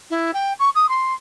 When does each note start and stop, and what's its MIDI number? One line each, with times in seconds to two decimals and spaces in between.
0.10 0.31 64
0.33 0.53 79
0.59 0.70 85
0.75 0.89 87
0.89 1.13 84